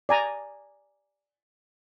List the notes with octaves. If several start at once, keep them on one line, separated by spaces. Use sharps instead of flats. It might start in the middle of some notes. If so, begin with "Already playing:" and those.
D5 G#5 A#5